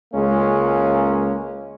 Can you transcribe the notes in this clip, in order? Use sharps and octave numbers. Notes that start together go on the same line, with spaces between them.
C#2 G#3 A#3 C#4